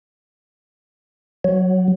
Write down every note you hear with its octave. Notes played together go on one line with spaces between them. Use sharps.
F#3